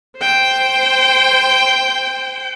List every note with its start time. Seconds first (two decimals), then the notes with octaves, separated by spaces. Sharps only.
0.17 C5 G5